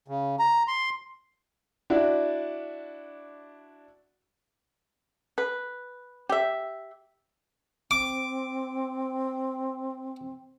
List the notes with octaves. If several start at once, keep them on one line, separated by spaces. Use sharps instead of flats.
C#3
A#5
C6
D4 E4 F#4 D5
B4
G4 E5
C4 D6